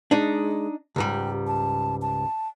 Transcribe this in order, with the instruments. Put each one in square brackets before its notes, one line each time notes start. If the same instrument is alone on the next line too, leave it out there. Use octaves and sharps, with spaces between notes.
[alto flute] G#3 [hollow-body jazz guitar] D4 D#4
[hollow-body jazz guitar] C#2 G#2 G3 [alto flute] G4
[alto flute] A5
A5